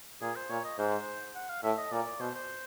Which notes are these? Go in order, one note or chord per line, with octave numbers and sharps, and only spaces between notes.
A#2 G#4
C5
A#2 C#5
D#5
G#2 C5
F#5
F5
A2 E5
D#5
A#2 D5
B2 C5
C5